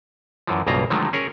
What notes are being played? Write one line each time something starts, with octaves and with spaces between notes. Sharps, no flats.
F#2 E3 F3
B1 G2 C#3 A#3 F4 A#5
D3 D#3 F3 F#3 G#3 A3
C#4 G#4 A#4 C#5